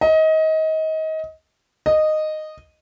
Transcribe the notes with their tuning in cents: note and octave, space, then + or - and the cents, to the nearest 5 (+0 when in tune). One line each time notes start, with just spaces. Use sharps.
D#5 +25
D#5 -10